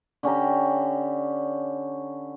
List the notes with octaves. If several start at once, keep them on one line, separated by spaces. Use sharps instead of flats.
D3 C#4 G4 A#5